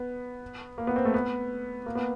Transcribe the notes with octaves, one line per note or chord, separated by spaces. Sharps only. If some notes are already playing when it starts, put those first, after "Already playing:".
Already playing: B3
A#3
B3
C4
A3
B3
A#3
B3